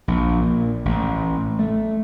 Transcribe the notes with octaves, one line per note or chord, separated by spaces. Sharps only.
A#1
A#2
A1
A3